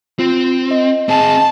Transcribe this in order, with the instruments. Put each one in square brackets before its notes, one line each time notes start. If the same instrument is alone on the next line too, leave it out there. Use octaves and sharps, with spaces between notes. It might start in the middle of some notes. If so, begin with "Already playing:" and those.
[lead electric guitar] C4 [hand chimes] F4
[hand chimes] D#5
[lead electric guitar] C4 G#4 [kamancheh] A5